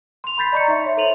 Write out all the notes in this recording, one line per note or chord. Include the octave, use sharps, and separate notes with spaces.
C6 F7
B5 C6 G6 A6 B6 C7
D5 D#5 A#5 C#6 G6 C#7
D#4 E5 C6
C#5 E5
A4 C5 C6 D#7 F7 F#7